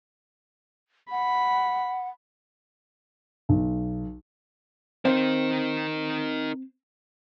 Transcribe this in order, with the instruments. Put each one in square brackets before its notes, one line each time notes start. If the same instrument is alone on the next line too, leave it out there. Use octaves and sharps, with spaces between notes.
[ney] F#5 [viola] B5
[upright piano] B1
[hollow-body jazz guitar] C4 C5 F5 [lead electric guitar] D#4 A#4